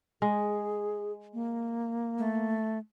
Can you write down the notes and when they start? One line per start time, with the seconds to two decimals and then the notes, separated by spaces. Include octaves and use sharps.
0.22 G#3 G#4
1.34 A#3
2.18 A3